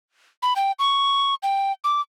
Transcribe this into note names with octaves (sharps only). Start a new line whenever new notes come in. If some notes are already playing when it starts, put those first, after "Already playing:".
B5
G5
C#6
G5
D6